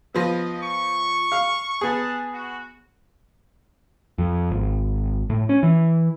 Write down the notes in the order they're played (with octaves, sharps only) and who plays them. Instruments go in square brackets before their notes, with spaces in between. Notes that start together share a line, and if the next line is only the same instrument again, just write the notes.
[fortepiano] F3 B3 [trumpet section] D#5
[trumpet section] C#6
[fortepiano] F5
[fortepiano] B3 G#4 [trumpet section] F#5 A5
[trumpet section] F#4
[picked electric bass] F2
G#1
A2
C#4
E3